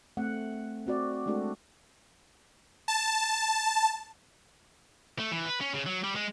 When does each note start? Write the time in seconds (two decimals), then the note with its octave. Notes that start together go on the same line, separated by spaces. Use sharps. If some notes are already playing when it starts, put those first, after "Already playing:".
0.17 A3 C4 F#5
0.87 C4 F#4 D5
1.26 G#3 A3 D4 F#4 A4
2.88 A5
5.19 A3
5.32 E3
5.46 B4
5.61 C#4
5.74 C#3
5.86 F#3
6.04 G3
6.16 G#3